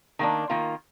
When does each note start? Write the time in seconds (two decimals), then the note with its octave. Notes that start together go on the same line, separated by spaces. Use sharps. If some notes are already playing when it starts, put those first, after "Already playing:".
0.19 D#3 A#3 D4
0.50 D#3 A#3 F4